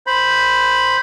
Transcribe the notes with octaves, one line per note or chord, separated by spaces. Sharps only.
C5 B5